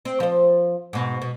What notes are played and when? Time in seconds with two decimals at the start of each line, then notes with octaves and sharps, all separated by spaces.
0.05 C4
0.20 F3 C5
0.93 G#2 B2
1.22 B2